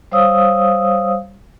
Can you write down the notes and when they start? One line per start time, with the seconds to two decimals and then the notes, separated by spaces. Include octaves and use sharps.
0.12 G3 C5 C#5 F5 D#6 E6